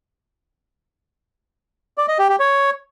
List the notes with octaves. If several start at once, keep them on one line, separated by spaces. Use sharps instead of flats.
D5
D#5
G4
G4
C#5